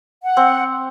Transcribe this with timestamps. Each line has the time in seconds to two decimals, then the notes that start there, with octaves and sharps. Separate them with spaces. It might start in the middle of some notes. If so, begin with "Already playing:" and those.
0.23 F#5
0.37 C4